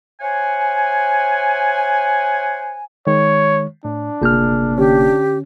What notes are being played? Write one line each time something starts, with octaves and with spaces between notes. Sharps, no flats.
C5 C#5 E5 F#5 G#5
D#3 G#3 C#5
A2 D4
G1 C3 A#3 G#4 F6
D3 C#4 G4